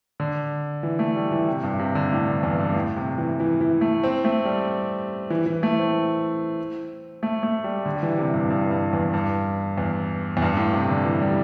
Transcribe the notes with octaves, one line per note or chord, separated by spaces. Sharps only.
D3
E3
A3
G3
E3
C3
G2
C3
D3
A2
G2
E2
G2
A2
C3
E3
E3
E3
A3
C4
A3
G3
E3
E3
A3
C4
A3
A3
G3
D3
G3
E3
C3
G2
G2
G2
E2
G2
E2
E2
G2
A2
C3
D3
E3
G3